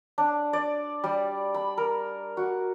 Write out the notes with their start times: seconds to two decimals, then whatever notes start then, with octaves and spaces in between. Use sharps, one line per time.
0.18 D4
0.53 D5
1.04 G3
1.54 B5
1.78 A#4
2.37 F#4